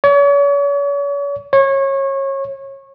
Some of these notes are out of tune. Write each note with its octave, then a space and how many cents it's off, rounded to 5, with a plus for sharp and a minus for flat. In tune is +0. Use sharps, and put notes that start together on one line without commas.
C#5 +40
C#5 -25